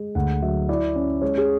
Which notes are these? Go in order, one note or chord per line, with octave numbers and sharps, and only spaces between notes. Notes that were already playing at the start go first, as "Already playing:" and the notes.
Already playing: G#3
D2 F#5
F#3 E5
E4 D5
C#4
G#3 C#5
G#4